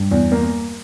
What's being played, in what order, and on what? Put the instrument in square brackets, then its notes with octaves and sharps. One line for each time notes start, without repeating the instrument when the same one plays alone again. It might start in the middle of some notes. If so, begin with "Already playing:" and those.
Already playing: [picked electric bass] G2
[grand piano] E2
A#3